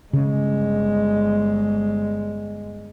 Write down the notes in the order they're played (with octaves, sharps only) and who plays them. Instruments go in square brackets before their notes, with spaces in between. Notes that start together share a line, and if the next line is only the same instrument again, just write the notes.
[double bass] G1 G#3 [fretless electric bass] C#3